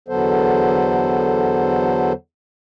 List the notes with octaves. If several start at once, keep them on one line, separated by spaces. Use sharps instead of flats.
E2 D3 F#3 B3 A4 C5